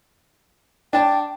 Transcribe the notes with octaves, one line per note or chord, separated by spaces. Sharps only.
D4 G5 A5